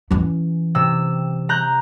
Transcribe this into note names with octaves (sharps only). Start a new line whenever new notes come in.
E3 C#4
C3 E6
A#5 F#6 G6